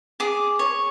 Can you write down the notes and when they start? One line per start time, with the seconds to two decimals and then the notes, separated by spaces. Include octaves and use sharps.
0.20 G#4 D6
0.59 C#5